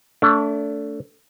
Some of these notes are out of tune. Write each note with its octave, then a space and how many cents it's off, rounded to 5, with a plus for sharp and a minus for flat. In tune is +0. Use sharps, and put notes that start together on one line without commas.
A3 +10 D4 -35